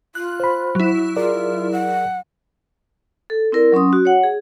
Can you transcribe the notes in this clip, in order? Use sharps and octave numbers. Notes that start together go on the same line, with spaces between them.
F4 F#6
C5 B5
F#3 E4
F4 G#4 A#4 D5
F#5
A4
C4 E4 A#4 D5
F#3 C#4 C6 D#6
F#4
C#5 F#5
G#4